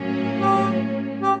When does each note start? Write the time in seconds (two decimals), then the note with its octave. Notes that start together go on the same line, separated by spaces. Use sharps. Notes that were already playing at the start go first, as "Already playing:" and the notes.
Already playing: A2 F#3 A#3 C#4
0.41 G4
1.22 G4